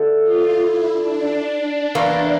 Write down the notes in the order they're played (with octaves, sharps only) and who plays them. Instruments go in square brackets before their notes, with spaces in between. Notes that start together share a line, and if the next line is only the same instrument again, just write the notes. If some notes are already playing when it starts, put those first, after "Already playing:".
Already playing: [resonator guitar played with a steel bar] D3 A3
[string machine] F4
E4
D4
[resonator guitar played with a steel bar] E2 E3 A#3